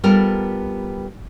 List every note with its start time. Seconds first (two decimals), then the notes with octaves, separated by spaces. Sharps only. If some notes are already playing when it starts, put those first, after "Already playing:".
0.04 G3 B3 F4 A4 A#4